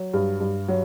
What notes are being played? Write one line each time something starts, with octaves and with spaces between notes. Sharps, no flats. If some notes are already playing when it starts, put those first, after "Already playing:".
Already playing: F#3
G2
G2
F#3